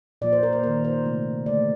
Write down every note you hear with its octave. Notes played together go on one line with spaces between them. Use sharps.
A#2 F3 A#3 D5
C5
A#4
C5
D#3 A#3 A#4
C5
C3 F3 A3
D3 F3 A3 D5